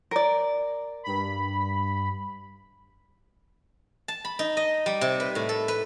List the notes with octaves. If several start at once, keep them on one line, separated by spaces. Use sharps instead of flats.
A#4 D5
G2 B5
A5
B5
D#4
D#5
G3
C3
B4
A2
A4
B4